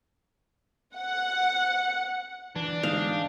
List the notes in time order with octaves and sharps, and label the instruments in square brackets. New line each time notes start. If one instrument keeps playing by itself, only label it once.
[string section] F#5
[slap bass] E3 [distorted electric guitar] D4
[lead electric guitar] G#2 D#4 [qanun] F5